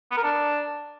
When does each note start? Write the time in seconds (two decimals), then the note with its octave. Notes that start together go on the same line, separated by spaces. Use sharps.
0.11 B3
0.17 A#4
0.23 D4